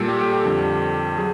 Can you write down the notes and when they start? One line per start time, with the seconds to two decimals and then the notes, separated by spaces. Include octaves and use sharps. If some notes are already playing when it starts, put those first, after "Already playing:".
Already playing: A#2 G3 A4
0.08 G4
0.21 G4
0.33 G4
0.45 F2 D3 G3
1.18 F#3 G#4